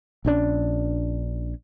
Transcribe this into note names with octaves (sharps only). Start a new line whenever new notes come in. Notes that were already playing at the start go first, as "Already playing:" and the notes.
A#1 C#4 D4